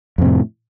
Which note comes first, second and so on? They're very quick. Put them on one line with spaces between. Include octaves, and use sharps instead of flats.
F2 C3 A2